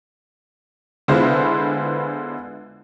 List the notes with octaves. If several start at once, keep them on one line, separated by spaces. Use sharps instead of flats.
D3 G#3 B3 E4 F4 C5